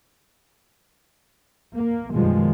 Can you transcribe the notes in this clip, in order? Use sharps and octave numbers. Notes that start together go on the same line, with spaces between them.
A#3
F#2 B2 D#3 F3 G3 G#3